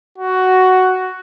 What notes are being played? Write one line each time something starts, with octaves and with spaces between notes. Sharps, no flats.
F#4